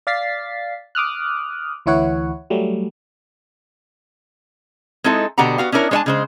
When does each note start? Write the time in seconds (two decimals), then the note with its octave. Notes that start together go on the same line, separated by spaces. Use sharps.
0.07 D5 F5 A6 B6 C7
0.95 D6 D#6 F6 F#6
1.86 D2 E3 E4 C#5 F#5
2.50 F#3 G3 A3
5.04 G#3 C4 D#4 E4 A4
5.38 B2 D3 G4 F#5 A#5
5.58 B3 F#4 F5
5.72 C#4 D4 E4 A#4 C#5
5.91 G#3 D4 C#5 E5 G#5 A5
6.06 C#3 G#3 C5